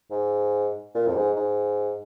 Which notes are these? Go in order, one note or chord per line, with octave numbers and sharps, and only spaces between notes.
G#2
A#2
F2
G#2
G#2